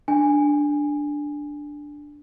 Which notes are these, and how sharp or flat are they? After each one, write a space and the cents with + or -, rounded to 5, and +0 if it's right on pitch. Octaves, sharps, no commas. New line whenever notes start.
D4 +0 G#5 -10